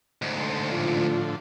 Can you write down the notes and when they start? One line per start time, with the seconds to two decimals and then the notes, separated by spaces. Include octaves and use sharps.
0.22 D2 G#2
0.39 A4 C5
0.70 A2 D3 F3 F4